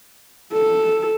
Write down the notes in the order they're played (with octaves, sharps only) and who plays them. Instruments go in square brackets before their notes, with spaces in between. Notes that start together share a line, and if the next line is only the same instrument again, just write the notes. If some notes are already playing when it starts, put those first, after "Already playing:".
[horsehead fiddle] A4